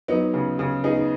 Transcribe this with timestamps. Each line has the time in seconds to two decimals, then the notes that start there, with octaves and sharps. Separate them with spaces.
0.08 F#3 B3 D#4
0.34 C#3
0.59 C#3
0.84 B3 D#4 G#4